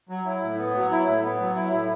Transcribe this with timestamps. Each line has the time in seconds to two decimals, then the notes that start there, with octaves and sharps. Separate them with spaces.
0.09 F#3
0.25 E4
0.42 A2
0.58 B3
0.75 F#3
0.91 E4
1.06 A2
1.23 B3
1.40 F#3
1.55 E4
1.72 A2